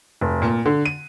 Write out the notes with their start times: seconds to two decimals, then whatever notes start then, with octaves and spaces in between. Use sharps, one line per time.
0.21 F1
0.42 A#2
0.66 D3
0.86 D#7